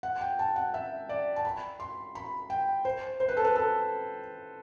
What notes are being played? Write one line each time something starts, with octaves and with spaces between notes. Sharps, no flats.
F#5
G5
A5
F#5
E5
D5
A5
B5
C6
B5
G5
C5
C5
B4
A4
B4
A4